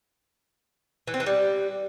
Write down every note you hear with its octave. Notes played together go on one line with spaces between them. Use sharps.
E3
C4
E3
G3